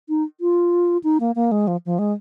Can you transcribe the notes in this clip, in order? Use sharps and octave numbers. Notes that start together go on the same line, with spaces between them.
D#4
F4
D#4
A#3
A#3
G#3
F3
F3
G#3